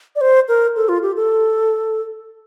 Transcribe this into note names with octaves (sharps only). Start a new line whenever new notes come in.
D5
C5
A#4
A4
F4
G4
A4